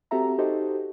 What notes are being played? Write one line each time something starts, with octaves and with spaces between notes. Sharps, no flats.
C4 F#4 G4 A4 E5 A#5
D#4 F#4 G4 A4 C5 D#5